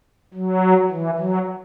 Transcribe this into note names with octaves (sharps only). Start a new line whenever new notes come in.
F#3
E3
F#3